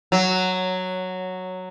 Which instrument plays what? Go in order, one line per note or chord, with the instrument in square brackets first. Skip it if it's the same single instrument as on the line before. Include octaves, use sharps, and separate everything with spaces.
[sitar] F#3